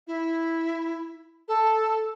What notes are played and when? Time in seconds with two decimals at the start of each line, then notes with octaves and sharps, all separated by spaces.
0.07 E4
1.48 A4